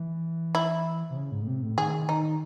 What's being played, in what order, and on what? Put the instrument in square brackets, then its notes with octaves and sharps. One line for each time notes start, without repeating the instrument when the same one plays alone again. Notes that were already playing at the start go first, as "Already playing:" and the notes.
Already playing: [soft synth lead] E3
[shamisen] E4
[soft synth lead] C3
C#3
G#2
A2
C3
A2
[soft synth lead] D#3 [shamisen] G#4
[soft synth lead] D#3 [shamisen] D#4